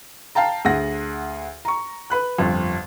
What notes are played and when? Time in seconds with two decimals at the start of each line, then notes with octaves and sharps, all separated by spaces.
0.35 F5 G5 A5 A#5
0.65 D2 G#4 F#5 A#6
1.65 A#5 C#6
2.10 B4 B5 F#6
2.39 G1 F2